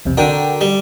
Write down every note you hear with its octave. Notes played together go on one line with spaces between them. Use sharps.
B1 E2 C3
D3 D4 F#4 A#4 G5
G3